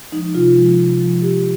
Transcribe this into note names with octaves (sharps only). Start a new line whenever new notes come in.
F3 G#3 D#4
C3 F4
F3 G#3
C3
F3 G#3
C3 G4